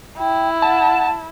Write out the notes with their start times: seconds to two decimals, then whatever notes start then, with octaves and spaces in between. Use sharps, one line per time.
0.18 E4 G5
0.62 F#5 A5